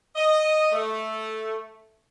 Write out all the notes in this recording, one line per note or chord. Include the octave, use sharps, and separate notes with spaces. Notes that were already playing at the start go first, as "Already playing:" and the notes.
D#5
A3